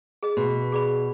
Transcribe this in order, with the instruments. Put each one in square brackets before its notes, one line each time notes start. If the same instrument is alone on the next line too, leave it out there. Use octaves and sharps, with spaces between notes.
[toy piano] G#4 D#5
[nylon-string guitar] B2 [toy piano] F#4
[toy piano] G#4 D5 B5